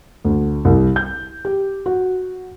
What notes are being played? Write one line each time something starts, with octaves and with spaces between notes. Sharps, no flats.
D2
C2
G6
G4
F#4